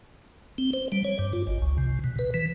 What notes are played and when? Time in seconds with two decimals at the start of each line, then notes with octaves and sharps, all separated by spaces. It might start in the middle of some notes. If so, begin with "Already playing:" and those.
0.58 C4
0.73 C5
0.92 G3
1.05 C#5
1.19 G2
1.33 F4
1.47 G#1
1.62 C#2
1.78 C3
2.04 B2
2.19 B4
2.34 E3